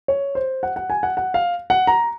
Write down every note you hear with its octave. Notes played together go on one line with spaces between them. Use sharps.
C#5
C5
F#5
F#5
G#5
F#5
F#5
F5
F#5
A#5